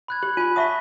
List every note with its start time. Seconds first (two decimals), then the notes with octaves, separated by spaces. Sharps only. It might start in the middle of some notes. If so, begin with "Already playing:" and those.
0.08 B5 F#6 G#6
0.23 G4 F#7
0.37 F4 G#5 B5 D#7
0.56 E5 F#5 A5 C#6 D#6 B6